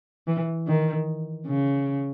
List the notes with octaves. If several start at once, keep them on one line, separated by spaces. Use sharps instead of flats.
E3
D#3
C#3